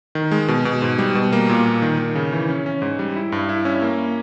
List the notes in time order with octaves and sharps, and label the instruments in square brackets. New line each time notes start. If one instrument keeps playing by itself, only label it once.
[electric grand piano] D#3
G#3
B2
B2
G#2
G3
B2
A#3
A#2
A#2
D#3
D#3
C#3
E3
C#4
C#4
G#2
G3
E4
G2
E4
C#4
A#3